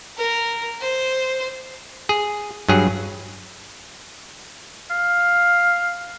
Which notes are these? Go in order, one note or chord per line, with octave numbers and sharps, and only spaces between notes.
A#4
C5
G#4
G2 F#3 G#4
F5